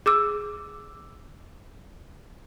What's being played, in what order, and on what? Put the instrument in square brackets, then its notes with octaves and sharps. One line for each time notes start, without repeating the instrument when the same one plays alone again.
[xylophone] G#4 D6 E6